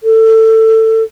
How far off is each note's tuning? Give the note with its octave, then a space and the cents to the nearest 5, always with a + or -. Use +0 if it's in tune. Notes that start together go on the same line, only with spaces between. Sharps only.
A4 +20